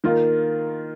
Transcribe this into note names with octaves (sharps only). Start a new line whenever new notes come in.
D#3 A#3 F4